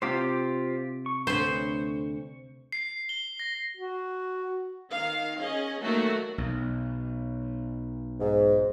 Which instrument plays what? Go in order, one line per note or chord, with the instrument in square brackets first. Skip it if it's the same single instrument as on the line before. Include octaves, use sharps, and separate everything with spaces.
[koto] C3 [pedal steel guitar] F4 G4 C5
[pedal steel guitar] C#6
[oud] D2 B4 [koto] C5
[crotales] C7
G7
A#6
[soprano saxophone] F#4
[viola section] D#3 F5
C#4 G#4 D#5
D#3 F#3 A3 A#3 F#4
[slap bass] B1
[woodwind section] G#2